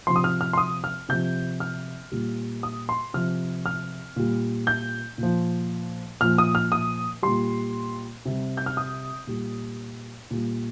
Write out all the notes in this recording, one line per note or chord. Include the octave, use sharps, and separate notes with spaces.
C3 F3 C6
D#6
F6
F6
C6
D#6
F6
C3 F3 G6
F6
A#2 G3
D#6
C6
C3 F3 F6
F6
A#2 G3
G6
A#2 F3
A#2 F3 F6
D#6
F6
D#6
A#2 G3 C6
C3 G3
G6
F6
D#6
A#2 G3
A#2 G3